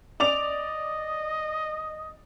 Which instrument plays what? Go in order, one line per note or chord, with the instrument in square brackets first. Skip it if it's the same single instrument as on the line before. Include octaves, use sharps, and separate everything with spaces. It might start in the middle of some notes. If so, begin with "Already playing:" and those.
[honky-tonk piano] D5 D6 F7 [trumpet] D#5